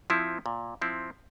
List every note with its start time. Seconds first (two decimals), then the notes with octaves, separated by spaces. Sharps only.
0.10 F3 C4 E4
0.46 A#2
0.82 F3 C4 E4